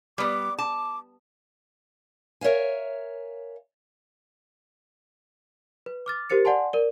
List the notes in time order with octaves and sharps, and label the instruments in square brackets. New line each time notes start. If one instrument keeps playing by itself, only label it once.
[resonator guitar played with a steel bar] G3 B3 [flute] D6
[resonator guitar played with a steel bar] A5 [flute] D6
[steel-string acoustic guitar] A#4 C#5 E5 F5 G#5
[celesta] B4
D6 F6 A6
G4 A#4 C5 A6 C#7
D5 F#5 G#5 A5 C6
A#4 D5